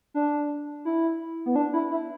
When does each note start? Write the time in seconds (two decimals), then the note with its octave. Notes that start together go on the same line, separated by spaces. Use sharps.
0.14 D4
0.85 E4
1.46 B3
1.56 D4
1.73 E4
1.91 E4